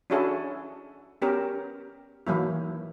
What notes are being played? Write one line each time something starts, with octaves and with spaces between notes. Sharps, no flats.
C#4 D4 E4 F#4 G#4 A4
B3 C#4 G4 A#4
D#3 E3 F#3 A#3 E4